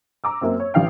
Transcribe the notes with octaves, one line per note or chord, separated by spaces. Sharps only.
A#5 D6 E6
F#2 A#3 C4
C#5
A1 E3 F5 G5